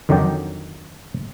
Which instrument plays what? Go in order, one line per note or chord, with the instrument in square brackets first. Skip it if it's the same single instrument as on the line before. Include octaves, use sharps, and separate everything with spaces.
[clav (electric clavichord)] F2 D3 D#3 F#3 D5 G5